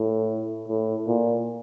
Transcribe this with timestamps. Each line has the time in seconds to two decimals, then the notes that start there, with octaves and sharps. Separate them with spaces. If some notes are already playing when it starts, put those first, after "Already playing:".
Already playing: A2
0.68 A2
1.08 A#2